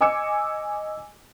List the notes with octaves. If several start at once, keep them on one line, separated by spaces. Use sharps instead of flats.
D#5 G#5 D6 E6 C#7